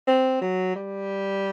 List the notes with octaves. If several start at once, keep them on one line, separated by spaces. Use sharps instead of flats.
C4
F#3
G3